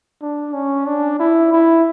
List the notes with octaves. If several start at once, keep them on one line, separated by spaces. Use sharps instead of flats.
D4
C#4
D4
E4
E4